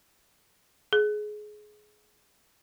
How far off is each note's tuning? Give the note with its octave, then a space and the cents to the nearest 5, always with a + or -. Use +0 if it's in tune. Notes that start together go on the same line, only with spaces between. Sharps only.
G#4 +20